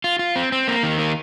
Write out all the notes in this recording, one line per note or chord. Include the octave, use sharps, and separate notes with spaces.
F4
F4
C4
C4
A#3
D#3
A#3